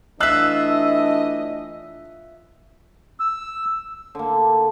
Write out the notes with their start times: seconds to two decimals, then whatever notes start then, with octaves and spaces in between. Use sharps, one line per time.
0.20 E3 A3 D4 F4 D#5 E5 E6 F#6
3.20 E6
4.15 D3 A#3